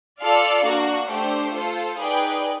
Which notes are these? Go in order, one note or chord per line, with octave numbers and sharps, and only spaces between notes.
F4 A4 D5 F5
A#3 D4 F#4
A3 D4 G4 C5
F4 A4 C5
D#4 G#4 B4 D5 G5